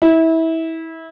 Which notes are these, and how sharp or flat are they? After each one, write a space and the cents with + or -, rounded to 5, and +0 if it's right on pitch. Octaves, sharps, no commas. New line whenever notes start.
E4 -25